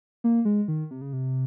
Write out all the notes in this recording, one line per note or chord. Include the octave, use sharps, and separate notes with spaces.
A#3
G#3
D#3
C3
C#3
C3